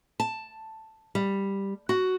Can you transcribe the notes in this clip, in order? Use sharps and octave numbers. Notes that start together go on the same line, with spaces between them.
A5
G3
F#4